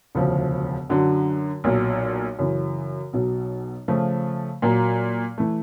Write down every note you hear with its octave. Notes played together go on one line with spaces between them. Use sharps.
E1 D2 C#3 F3
F#2 D3 F#3
B1 A#2 F#3
F#2 C#3 E3
B1 B2 F#3
C#3 F3 A3
A#2 F#3 A#3
E3 A3